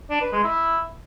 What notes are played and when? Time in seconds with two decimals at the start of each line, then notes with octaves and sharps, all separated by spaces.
0.10 D4
0.21 B4
0.32 G#3
0.43 E4